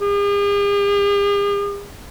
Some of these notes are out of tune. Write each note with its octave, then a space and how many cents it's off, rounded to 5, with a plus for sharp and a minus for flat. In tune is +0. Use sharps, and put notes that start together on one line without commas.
G#4 -45